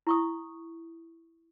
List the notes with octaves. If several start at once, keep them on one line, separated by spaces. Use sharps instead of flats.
E4 C#6 D#6